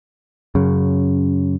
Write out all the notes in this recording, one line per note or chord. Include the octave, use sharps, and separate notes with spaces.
F#2 C#3